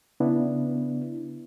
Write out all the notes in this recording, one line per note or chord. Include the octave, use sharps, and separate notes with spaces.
C#3 B3 D4 E4